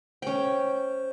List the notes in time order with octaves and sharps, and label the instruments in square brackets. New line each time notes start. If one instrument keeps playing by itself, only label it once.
[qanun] C#4 G5 [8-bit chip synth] C5